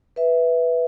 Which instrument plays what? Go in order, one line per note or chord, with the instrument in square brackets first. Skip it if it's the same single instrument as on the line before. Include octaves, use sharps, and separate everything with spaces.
[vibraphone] B4 E5